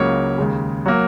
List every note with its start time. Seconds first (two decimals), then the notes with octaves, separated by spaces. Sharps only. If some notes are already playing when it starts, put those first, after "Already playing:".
Already playing: C#2 C#3 F#3 A#3 C#5
0.38 D#2 C#3 G#3
0.86 F#3 A#3